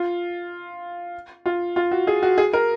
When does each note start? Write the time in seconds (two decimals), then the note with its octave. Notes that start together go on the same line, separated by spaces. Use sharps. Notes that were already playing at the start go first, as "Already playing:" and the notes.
Already playing: F4
1.46 F4
1.76 F4
1.91 F#4
2.07 G#4
2.23 F#4
2.38 G#4
2.53 A#4